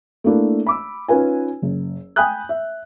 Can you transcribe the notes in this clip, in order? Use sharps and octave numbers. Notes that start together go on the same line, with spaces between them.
A3 A#3 D4 E4 A#4
B5 D6 E6
C#4 D#4 F4 B4 G#5
F#1
G5 G#5 B5 D#6 F#6 G6
E5